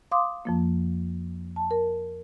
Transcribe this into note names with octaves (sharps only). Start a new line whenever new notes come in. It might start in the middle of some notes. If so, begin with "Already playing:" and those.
F5 C6 D6 D#6
F2 F3 A#3
A5
A#4